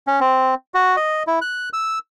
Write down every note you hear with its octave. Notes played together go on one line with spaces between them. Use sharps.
C#4
C4
F#4
D#5
E4
F#6
E6